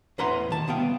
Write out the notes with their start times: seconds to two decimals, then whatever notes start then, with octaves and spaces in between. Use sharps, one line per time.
0.18 E2 A2 B4 F#5 A#5 C6
0.50 D#3 A5
0.68 C2 B3 F5 G5